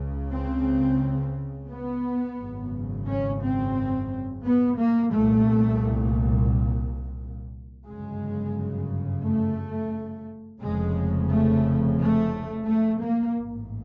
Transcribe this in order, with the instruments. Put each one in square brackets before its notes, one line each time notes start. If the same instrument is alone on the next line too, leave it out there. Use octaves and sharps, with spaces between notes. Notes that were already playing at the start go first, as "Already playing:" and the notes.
Already playing: [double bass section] C#2 C#3
C4
B3
G#1 F#2 C#3
C#4
C4
B3
A#3
C2 A#2 A3
G1 F#2 C#3 G#3
A3
F1 F2 C#3 G#3
A3
A3
A3
A#3
A1 G#2